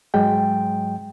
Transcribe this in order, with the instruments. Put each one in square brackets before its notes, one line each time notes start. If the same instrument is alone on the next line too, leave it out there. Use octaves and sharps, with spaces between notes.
[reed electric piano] G#2 F#3 G#3 G5